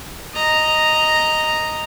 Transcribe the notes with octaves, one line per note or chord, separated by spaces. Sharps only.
D#5 A#5